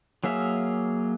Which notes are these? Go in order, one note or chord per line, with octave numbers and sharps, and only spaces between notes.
F#3 A#3 G#4 E5 F5